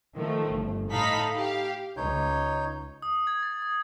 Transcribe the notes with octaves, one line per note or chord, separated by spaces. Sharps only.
D#3 F3 A3
G1
A2 D#4 A4 F5 B5 B6
G4 F5
C#2 D#4 C#5 G6
D#6
G#6
A6
D#6